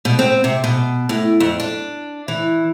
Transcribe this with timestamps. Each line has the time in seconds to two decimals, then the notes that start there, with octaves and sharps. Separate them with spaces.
0.05 B2
0.19 C4
0.44 C3
0.64 B2
1.09 A2
1.40 F2
1.60 D4
2.28 E3